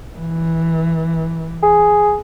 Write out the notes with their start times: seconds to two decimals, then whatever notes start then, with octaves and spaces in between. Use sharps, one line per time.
0.17 E3
1.63 G#4